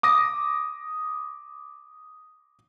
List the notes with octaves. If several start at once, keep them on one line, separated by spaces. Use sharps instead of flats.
D6 D#6 A#6